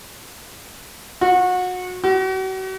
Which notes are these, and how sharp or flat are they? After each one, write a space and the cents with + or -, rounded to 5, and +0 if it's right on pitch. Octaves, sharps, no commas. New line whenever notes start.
F#4 -25
F#4 +40